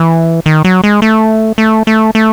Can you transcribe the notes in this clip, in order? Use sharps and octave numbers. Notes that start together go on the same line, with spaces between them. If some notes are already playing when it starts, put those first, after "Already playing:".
Already playing: E3
D#3
F#3
G#3
A3
A3
A3
A3